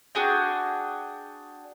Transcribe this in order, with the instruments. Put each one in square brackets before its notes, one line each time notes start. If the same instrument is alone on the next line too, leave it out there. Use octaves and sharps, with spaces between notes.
[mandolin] D4 F#4 G#4 G5